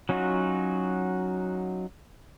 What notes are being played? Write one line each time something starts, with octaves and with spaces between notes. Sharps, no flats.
F#3 C#4 D#4 F4 F#4